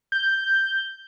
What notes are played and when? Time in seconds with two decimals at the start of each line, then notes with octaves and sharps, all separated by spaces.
0.12 G6